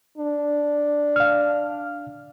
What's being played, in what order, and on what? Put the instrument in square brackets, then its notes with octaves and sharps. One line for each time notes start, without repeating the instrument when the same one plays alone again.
[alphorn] D4
[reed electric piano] F5 F6